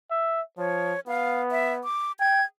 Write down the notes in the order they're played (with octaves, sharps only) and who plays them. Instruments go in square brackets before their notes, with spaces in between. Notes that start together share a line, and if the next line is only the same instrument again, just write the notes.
[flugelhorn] E5
[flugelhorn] F3 [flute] C#5
[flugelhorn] B3 [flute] F5
[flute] E5
D6
[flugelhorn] G5 [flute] G#6